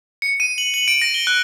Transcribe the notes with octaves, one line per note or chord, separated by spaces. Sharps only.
C#7
D#7
F#7
F#7
D7
A#6
G7
F#6